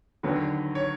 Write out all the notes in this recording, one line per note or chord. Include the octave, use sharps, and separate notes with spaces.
D#2 D3 F#3 B3
C#5